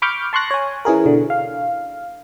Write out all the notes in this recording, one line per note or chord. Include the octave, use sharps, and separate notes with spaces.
B5 C#6 D6 F6 G6
A5 C6 C#6 F#6 A#6
C#5 G#5
E3 C#4 G#4 A#4
B2 D3
F5